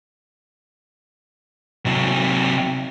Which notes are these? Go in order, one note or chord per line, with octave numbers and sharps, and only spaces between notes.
C3 F#3